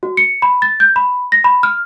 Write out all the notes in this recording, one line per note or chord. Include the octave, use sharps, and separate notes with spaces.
F#4
C#7
B5
A6
G6
B5
A#6
B5
F6